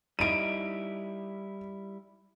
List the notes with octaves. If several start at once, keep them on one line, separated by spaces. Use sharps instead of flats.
G3 D#4 E4 D7 D#7